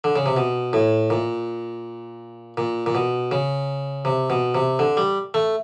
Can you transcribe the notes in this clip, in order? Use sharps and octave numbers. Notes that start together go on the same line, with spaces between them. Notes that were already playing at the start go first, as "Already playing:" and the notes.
D3
C#3
C3
B2
A2
A#2
A#2
A#2
B2
C#3
C3
B2
C3
D3
G3
A3